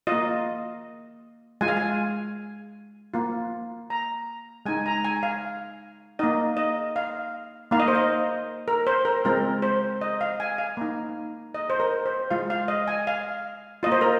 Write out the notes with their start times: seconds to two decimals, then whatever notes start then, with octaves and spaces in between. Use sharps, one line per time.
0.07 A#3 F4 D#5
1.61 G#3 F4 G#5
1.68 F5
1.77 G#5
3.14 A#3 F4
3.90 A#5
4.66 G#3 D#4 G#5
4.86 A#5
5.04 G#5
5.23 F5
6.19 A#3 D#4 D#5
6.57 D#5
6.96 F5
7.71 A#3 D#4 F5
7.80 D#5
7.88 C5
7.95 D#5
8.68 A#4
8.87 C5
9.05 A#4
9.25 G#3 C4 F4 A#4
9.62 C5
10.01 D#5
10.21 F5
10.40 G#5
10.58 F5
10.77 A#3 D#4
11.54 D#5
11.70 C5
11.80 A#4
12.06 C5
12.30 G#3 F4 F5
12.50 F5
12.68 D#5
12.88 G#5
13.07 F5
13.83 A#3 F4 D#5
13.92 C5
14.01 A#4